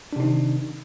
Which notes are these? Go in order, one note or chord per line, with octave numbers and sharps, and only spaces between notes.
C3 D#3 D4 D#4